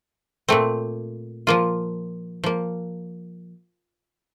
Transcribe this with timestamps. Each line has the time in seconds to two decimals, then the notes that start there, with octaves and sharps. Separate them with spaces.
0.49 A#2 A3 C4
1.47 F3 A#3 F4
2.44 F3 A#3